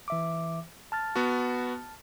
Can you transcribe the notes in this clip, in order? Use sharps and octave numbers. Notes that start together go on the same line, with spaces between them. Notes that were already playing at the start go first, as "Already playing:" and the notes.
E3 E5 D6
A5 F6 A6
B3 F#4